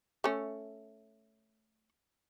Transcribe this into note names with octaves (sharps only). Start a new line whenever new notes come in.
A3 C#4